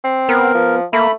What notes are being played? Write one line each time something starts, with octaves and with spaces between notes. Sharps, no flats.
C4
B3 A#4
F3
A3 A#3 B5